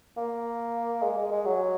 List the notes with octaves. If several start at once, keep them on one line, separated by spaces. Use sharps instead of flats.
A#3
G#3
G#3
G#3
F#3